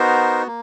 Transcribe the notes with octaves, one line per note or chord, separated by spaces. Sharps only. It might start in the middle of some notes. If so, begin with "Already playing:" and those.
Already playing: B3 D#4 F#4 A#4 C5
A#3